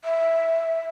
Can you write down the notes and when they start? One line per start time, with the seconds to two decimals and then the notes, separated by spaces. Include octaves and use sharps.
0.04 E5